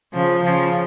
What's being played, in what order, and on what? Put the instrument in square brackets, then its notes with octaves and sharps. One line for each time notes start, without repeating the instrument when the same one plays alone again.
[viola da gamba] C#3 F3
C#3 F3